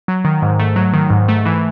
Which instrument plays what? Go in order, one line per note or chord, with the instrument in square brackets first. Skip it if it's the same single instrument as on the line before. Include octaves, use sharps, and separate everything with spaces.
[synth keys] F#3
D#3
G#2
A3
F#3
D#3
G#2
A3
E3